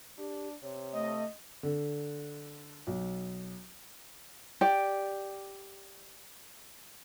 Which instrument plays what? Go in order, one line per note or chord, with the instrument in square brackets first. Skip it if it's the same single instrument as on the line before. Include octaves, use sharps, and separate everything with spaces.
[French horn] D4 [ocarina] G4
[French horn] C3 [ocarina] C#5
[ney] A3 [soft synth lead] D#5
[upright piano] D3
B1
[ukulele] G4 D5